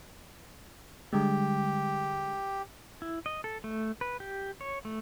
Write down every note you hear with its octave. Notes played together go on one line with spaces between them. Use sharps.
D3 G3 G#3 G4
E4
D#5
A4
A3
B4
G4
C#5
A3